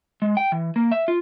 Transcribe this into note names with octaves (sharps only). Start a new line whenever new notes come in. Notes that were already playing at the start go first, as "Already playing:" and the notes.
G#3
G5
E3
A#3
E5
F4